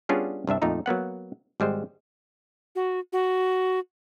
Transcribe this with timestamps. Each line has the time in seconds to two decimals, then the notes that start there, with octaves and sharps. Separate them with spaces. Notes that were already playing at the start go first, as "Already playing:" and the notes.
0.09 G3 B3 C#4 D4 F4 G#4
0.47 C2 G2 D4 E5
0.62 F2 A#2 A3 D#4 A#5
0.86 F#3 A#3 B3 F#5
1.60 G#1 G3 G#3 C5
2.75 F#4
3.13 F#4